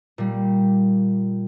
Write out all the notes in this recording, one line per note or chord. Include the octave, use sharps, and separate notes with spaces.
A#2 G3